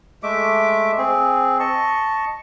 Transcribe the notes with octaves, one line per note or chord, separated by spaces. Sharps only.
G#3 A3 E5 D6
C4 G#4
D#5 A5 C#6